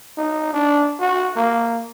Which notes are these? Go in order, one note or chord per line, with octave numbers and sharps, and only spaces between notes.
D#4
D4
F#4
A#3